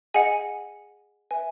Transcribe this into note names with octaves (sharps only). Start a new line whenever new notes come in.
G#4 D#5 F#5 G#5
B4 E5 G#5